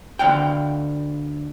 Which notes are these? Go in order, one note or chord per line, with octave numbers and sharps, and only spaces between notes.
D2 F5 G5